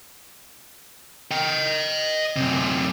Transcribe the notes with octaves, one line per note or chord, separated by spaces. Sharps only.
D#5 G5
F#2 C3